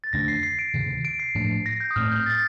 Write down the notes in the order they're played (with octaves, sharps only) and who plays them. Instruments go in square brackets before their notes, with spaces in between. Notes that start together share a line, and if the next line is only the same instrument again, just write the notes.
[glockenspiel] A6
[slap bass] F2 D3 A3 D4 [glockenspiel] A#6
[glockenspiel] C7
C7
D7
[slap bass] D2 C3 D#3
[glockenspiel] D7
C7
[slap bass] A2 F3 A3 D4
[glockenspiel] A#6
G6
D#6
[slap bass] A2 A3 C4 [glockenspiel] F6
[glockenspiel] G6
A6